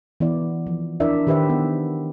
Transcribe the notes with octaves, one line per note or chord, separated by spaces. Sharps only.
E3 B3 E4 D5
F3
D4 E4 A#4 D5 E5
D#3 G4 B4 C5 E5
B3